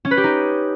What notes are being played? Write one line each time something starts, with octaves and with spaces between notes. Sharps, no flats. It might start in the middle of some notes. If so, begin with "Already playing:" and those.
C#4
B4
G4
D#4